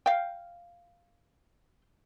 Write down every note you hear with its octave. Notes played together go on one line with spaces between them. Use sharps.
F5 G5